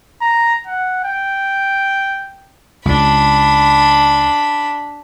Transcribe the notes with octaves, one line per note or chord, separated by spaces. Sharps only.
A#5
F#5
G5
C#2 D4 B5